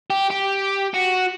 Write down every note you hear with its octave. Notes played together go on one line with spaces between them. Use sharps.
G4
G4
F#4